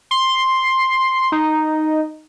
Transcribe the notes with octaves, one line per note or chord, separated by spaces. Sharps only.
C6
D#4